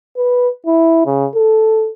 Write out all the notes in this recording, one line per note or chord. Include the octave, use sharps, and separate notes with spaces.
B4
E4
C#3
A4